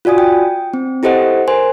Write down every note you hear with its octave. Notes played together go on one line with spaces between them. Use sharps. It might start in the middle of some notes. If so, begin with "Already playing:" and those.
F4 F#4 D5 G#5 D#6
G5
C4
E4 G4 A4 C5 D#5 F#5
A#4 C5 G#5 C6